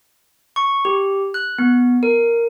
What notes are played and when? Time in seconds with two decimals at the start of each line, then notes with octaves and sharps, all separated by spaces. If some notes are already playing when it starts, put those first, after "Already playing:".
0.56 C#6
0.85 G4
1.34 F#6
1.58 B3
2.03 A#4